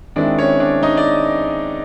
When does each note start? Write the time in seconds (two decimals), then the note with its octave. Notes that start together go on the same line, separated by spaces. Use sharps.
0.16 D#3 G#3 C4 D4 E4 D5
0.38 C#4 C#5
0.60 D4 D5
0.83 D#4 D#5
0.97 D5